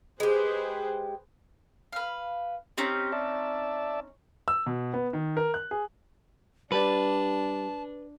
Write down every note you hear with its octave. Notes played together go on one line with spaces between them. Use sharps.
G#3 G4 G#4 B4 C5
B4 F5
C4 C#4 D#4 G4
D5 E5 A5
E6
B2
B3
D#3
A#4
F#6
G#4
G3 D4 G4 B4 D5 A5